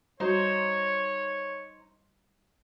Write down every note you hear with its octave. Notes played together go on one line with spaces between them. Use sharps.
G3 D#4 F#4 C5 C#5